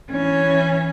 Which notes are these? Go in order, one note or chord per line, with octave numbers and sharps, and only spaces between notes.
E3 C#4